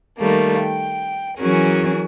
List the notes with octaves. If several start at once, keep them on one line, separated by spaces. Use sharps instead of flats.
D#3 G3 A3 A#3
G5
E3 F#3 C#4 F#4 G#4 A#4